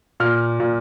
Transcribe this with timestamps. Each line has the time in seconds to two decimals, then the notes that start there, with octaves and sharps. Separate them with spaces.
0.20 A#2 F6
0.60 A#2